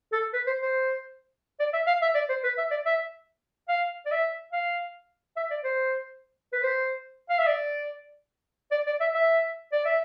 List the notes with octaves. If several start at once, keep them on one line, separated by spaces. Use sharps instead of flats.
A4
B4
C5
C5
D5
E5
F5
E5
D5
C5
B4
E5
D5
E5
F5
D5
E5
F5
E5
D5
C5
B4
C5
F5
E5
D5
D5
D5
E5
E5
D5
E5